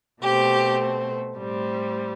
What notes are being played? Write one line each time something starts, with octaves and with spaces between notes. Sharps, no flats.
B2 A3 C4 G4
A2 G3 C4